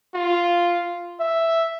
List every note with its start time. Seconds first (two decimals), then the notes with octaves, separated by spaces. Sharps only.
0.15 F4
1.20 E5